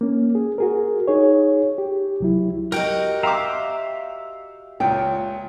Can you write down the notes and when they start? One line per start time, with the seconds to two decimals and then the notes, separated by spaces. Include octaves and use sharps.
0.01 A#3 C#4
0.35 G#4
0.58 F#4 G#4 A#4
1.08 D#4 G#4 C#5
1.78 G4
2.20 C2 F#3 E4
2.72 F#4 G4 A#4 D#5 G5
3.23 E5 F5 G5 A#5 C6 D6
4.80 C#2 A#2 G5